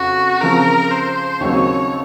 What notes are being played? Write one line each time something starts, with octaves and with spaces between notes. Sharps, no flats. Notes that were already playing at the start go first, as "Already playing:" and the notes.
Already playing: F2 C#3 F#4
C#3 F3 C4 A#4
C5
D#2 C#3 F#3 C4 C#5